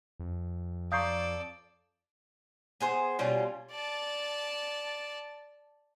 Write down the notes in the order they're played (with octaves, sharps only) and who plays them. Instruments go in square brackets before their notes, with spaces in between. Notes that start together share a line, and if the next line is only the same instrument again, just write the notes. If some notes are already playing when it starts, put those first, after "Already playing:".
[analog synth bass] F2
[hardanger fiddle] A4 D5 [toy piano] F5 A#5 C#6 [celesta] D#6 G6 C7
[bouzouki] B3 G#4 C5
B2 G3 C#4 F4
[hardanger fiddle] D5 A5